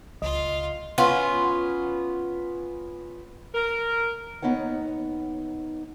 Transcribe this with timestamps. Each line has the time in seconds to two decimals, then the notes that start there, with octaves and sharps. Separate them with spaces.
0.22 C#2 F4 D#5 F5
0.98 B3 C#4 F4
3.55 A#4
4.42 D#2 C3 B3 D#4 C#5 F#5